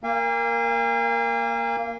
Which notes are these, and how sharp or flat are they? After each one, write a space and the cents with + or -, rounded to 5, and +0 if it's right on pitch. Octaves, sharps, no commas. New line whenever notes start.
A#3 +0 F5 -30 G#5 -45